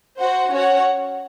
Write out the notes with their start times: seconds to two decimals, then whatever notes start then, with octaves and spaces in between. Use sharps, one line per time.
0.20 F#4 C5 F#5
0.52 C#4 F#4 C#5 F#5